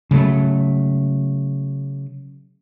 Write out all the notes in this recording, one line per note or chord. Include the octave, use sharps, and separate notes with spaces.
C#3 F#3 A3